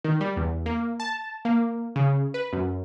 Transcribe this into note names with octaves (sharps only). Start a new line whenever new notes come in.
D#3
G3
E2
A#3
A5
A#3
C#3
B4
F#2